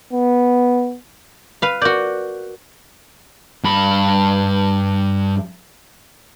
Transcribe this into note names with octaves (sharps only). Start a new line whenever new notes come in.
B3
B4 F5
F#4 A#4 D5 G6
G2 B5